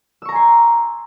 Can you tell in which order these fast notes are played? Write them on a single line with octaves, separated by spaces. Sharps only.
E6 C#6 A#5 G#5 C6